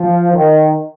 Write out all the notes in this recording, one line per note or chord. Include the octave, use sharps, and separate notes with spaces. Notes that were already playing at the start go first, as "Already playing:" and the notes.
Already playing: F3
D#3